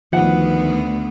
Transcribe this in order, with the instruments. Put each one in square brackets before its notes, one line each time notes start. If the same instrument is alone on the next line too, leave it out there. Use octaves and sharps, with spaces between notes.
[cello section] D2 B3 [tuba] D#3 [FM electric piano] F3 [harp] F#5